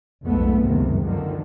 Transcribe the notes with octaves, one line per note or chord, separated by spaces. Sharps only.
B1 F2 G#2 A3 B3
F#1 C#2 G2 C3 D#3
F#2 D3 D#3 F3